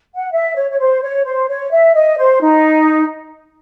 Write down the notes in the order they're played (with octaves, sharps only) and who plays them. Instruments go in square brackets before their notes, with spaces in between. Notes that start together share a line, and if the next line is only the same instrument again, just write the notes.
[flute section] F#5
E5
C#5
C#5
C5
C#5
C5
C#5
E5
D#5
C5
D#4